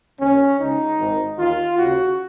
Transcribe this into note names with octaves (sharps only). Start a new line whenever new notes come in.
D#2 C#3 C#4
C#2 C#3 D#4
G#1 G#2 D#3
D#2 D#3 F4
D#2 C#3 F#4